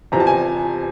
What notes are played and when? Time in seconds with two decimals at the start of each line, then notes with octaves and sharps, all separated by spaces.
0.12 E2 C3 F3 A#5
0.20 A5
0.27 G#5